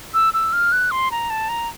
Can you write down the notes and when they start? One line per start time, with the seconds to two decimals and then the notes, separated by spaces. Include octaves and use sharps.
0.14 E6
0.34 E6
0.53 F6
0.72 F#6
0.91 C6
1.11 A#5
1.30 A5
1.49 A#5